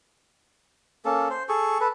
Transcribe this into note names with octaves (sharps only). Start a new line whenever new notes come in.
A#3 C#4 A4
C5
G#4 A4 C#6
A4 B4